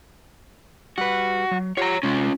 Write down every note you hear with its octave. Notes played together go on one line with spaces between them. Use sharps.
G3 F#4 B4
F#3
F4 G4 C#5 F#5 A#5
C3 G#3 C#4 F4